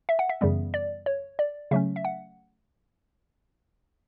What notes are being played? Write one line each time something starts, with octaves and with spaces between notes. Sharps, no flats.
E5
F#5
E5
F#2 C#3 E3 G3 B3
D5
C#5
D5
C#3 F#3 A3 C#4 E5
E5
F#5